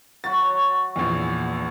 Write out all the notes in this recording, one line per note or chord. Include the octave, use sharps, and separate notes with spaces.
F#3 F#4 C#5 A6
A#1 E2